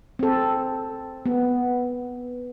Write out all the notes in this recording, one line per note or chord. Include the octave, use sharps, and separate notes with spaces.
C4 A4
B3